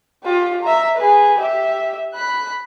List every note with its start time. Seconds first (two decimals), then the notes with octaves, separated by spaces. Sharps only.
0.24 F4 G4
0.62 E5 A#5
0.97 G#4 B4
1.38 G4 E5
2.14 B5 F#6